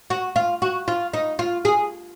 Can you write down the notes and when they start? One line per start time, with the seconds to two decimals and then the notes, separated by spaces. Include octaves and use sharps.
0.10 F#4
0.36 F4
0.62 F#4
0.88 F4
1.13 D#4
1.39 F4
1.65 G#4